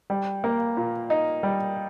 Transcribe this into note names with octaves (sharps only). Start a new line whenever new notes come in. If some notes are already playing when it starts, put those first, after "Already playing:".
G3
A#3
A#2
D#4
G3